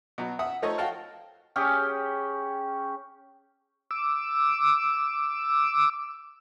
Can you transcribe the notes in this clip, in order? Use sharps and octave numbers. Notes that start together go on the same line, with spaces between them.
B2 F#3
E5 F#5 D#6
F3 A3 D#4 A4 C#5 D#5
F#4 F5 G5 A5 F6
C#4 G4 G#4
D6 E6